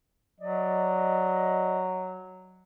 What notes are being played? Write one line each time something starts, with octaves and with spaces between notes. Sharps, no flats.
F#3 D5 D#5